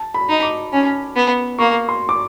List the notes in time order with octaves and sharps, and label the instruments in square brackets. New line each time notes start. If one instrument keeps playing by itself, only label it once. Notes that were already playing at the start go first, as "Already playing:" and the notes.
Already playing: [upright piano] A5
B5
[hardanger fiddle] D#4
[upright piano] D6
[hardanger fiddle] C#4
B3
[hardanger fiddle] A#3 [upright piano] C#6
[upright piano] C6
D6